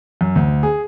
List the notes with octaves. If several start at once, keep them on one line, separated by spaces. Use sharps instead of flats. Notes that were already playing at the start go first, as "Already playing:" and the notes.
F#2
D2
G#4